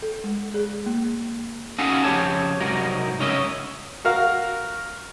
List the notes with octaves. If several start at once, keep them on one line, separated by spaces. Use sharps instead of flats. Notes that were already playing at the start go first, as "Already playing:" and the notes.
A4
G#3
G#4
A#3
C#4 D#4 F#4 G#4 A4 F5
F2 C#3 F#3 G4 C#5 A5
C2 G#2 F#3 D#4 A#4
G#2 C#3 C#4 A#4 D#5 E5
F#4 A#4 F5